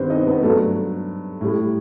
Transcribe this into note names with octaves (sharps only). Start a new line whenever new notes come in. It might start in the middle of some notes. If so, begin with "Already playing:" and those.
Already playing: G2 D#3 B3 C4 G4 B4 C5
D#4 D#5
B3 B4
G2 F#3 A3 A4
A2 G3